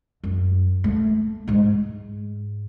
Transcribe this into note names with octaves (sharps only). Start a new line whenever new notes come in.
F#2
A3 A#3
G#2 G#3